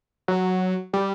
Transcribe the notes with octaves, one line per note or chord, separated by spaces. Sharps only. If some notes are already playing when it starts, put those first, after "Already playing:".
F#3
G3